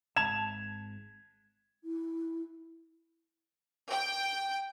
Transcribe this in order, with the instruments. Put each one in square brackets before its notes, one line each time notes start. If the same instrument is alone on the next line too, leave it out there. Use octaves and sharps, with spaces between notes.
[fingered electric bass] G#1 G#2 [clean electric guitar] A5 [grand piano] G#6 E7 F7
[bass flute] E4
[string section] G5